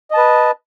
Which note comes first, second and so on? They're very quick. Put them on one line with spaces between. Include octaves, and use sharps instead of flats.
D#5 A5 B4